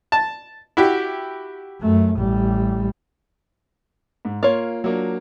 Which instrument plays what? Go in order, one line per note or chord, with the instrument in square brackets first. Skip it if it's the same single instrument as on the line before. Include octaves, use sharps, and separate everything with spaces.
[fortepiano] A5
E4 F#4 G4
[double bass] F#2 A3
A1 G3
[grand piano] G#2
[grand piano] A#3 [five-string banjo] F4 C#5
[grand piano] F#3 A#3 D4